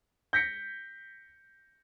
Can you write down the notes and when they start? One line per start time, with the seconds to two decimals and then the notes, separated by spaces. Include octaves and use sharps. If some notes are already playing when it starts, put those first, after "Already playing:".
0.33 G6 A#6 B6 C#7